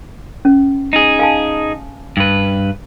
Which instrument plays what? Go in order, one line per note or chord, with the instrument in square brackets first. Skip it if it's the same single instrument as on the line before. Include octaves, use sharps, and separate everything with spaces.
[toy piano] C#4
[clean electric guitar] D#4 G#4
[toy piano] F5 G#5 A5
[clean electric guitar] G2 B4